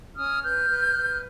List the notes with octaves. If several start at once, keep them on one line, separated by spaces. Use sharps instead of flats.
C#4 D#6 F6
B4 F6 G6
B4
B4